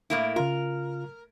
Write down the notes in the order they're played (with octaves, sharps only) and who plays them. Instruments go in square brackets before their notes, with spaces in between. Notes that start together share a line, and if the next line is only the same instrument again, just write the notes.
[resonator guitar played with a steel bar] A2 A#3 E4
[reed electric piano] C#3 F4 [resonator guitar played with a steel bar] A#4